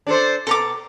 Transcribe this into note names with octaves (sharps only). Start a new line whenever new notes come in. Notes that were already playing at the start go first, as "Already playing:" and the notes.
D4 A4 C5
B2 A4 A#5 D6